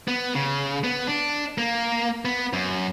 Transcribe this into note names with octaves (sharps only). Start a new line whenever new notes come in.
B3
C#3
B3
D4
A#3
B3
F#2